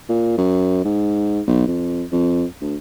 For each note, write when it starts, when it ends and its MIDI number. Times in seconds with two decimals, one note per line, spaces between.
0.09 0.36 46
0.37 0.81 42
0.84 1.41 44
1.47 1.67 35
1.67 2.04 41
2.12 2.44 41
2.61 2.76 38